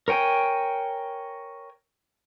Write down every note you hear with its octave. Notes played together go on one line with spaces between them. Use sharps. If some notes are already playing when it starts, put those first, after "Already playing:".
A#4 C#5 G5 G#5